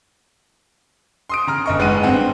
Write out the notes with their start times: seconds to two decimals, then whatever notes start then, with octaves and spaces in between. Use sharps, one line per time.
1.29 C6 D#6 D7
1.47 C#3 A#5 F6
1.66 G1 D#5 C#6
1.79 F#1 G#3 B4 F#5 D#7
2.03 G2 C4 F#5